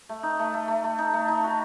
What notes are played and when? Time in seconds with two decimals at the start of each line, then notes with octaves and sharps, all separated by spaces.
0.09 A3
0.23 D#4
0.39 A3
0.54 A3
0.68 A3
0.84 A3
0.99 D#4
1.14 A3
1.28 D#4
1.44 F#4